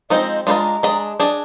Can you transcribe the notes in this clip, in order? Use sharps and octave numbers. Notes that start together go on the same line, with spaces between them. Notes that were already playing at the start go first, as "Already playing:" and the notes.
F3 G#3 C4 D#4 D#5
G#3 D4 F4 C5 D#5 A#5 C6
G#3 D4 G#4 D#5
D4 G#4 D#5